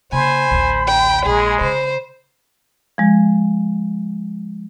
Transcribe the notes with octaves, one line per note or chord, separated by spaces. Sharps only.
C#3 A#3 C5 G#5 B5
A1 D2
G5
A#1 G#3 G#4
C#3 C5
F3 G#3